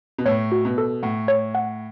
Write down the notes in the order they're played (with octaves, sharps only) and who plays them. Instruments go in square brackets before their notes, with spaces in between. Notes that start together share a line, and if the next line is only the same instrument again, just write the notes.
[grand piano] B2
[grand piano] A2 [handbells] C#5
[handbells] F#4
[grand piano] B2
[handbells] A4
[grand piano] A2 [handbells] F#5
[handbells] C#5
F#5